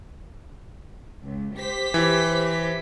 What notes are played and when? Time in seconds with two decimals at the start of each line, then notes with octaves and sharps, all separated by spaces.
1.24 C#2
1.56 G4 C5 B6
1.94 E3